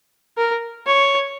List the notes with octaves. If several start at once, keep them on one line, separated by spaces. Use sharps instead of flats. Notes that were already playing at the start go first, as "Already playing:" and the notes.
A#4
C#5